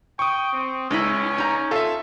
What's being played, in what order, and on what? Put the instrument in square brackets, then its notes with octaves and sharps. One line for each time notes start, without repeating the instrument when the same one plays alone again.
[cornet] G5 [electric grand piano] C#6 D#6
[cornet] C4
[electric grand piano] C#2 [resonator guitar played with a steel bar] G#3 D#4 E4 [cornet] C#4
[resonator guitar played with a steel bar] D#4 A#5
[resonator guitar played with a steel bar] F4 F5 [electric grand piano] A4 E5